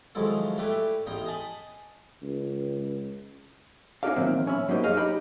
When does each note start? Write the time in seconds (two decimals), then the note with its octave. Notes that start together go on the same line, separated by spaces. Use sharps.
0.15 D#3 F3 F#3 G#3 E4 A4
0.58 A3 E4 G4 B4 D5 E5
1.06 A1 E2 D#4 G5 A#5
1.26 D#5 G#5 A5 B5
2.23 C#2
4.03 C#4 D#4 F#4 A4 D5 F5
4.16 A#2 D#3 E3 F#3 A#3 C4
4.47 C#4 E5 B5
4.68 F#3 G3 A#3 D#4 C5
4.84 F#2 G#4 C#5 D#5 F5
4.97 D#4 G4 D#5 B5